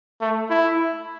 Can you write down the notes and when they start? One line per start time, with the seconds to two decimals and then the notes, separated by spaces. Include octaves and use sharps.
0.21 A3
0.50 E4